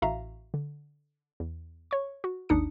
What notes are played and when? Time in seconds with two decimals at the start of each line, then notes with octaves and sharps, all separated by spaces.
0.02 A1 A2 F#4 E5 F5 A#5
0.54 D3
1.40 E2
1.91 C#5 C#6
2.24 F#4
2.49 G#1 D#2 D4 D#4 D#6 C#7